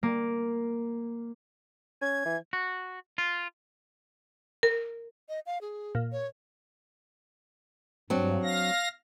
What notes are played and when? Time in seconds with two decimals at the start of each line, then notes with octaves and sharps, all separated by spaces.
0.03 A#3
2.01 C#4 G#6
2.25 E3
2.53 F#4
3.18 F4
4.63 A#4
5.29 D#5
5.46 F5
5.61 G#4
5.95 A#2
6.12 C#5
8.10 G2 F#3 C4 D4
8.43 F5 A#6